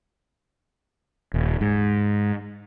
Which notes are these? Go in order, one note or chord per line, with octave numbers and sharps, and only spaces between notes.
D#1
G#2